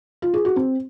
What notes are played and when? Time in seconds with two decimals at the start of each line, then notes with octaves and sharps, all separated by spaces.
0.22 F4
0.34 G#4
0.45 F#4
0.56 C4